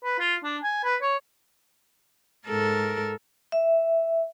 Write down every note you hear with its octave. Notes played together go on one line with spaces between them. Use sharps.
B4
F4
D4
G#5
B4
C#5
G#2 A4 A#4
E5